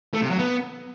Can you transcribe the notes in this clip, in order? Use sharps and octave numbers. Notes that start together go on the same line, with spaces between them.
A3
C3
F#3
B3